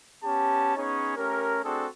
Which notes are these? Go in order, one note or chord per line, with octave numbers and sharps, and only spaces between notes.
B3 C#4 G4 A5
B3 C#4 D#4 G#4 C#5
A3 C#4 G4 A#4
A3 C4 D4 F#4 G#4 A4